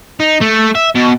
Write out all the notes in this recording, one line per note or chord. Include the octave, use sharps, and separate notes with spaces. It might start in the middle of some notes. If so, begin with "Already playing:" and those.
D#4
A3
E5
B2